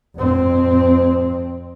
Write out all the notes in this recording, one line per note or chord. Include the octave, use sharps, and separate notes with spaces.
F2 C4